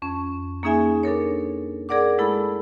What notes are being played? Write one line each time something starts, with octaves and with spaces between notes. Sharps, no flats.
F2 C#4
A#3 C#4 D#4 G#4 E5 G#5
D4 A4 A#4 C#5
G#4 A#4 D5 F#5 D6
G#3 A3 E4 A4 B5